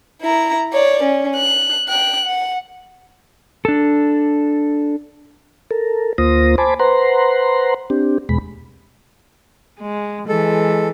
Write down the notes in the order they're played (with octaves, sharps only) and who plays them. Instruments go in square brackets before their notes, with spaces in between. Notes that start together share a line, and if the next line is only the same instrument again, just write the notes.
[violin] E4 A#5
C#5 D5
C#4
F#6
G5 F#6
F#5
[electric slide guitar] D4 A4
[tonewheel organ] A4 A#4
D2 A#3 F4 C5 D#6 A#6
C5 G#5 A5 B5 D6
B4 C5 F#5 A#5 C6
C4 D4 G4
E2 B2 G#3 B5
[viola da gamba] G#3
[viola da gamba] E3 [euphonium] G#3 [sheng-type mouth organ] A4